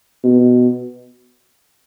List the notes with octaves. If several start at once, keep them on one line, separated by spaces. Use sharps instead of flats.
B2